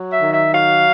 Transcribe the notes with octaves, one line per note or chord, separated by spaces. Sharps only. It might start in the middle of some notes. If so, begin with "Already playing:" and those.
Already playing: F#3
E5
D#3
E5
F#3 F5